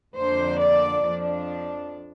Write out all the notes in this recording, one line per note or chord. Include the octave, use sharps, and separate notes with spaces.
F2 D3 A#3 D4 C5
D5
F2 F3 D4